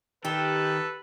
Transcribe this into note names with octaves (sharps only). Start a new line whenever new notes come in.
D#3 G4 A4 B4